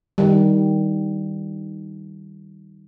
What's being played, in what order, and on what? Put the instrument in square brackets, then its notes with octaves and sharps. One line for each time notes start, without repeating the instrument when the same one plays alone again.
[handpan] D#3 G3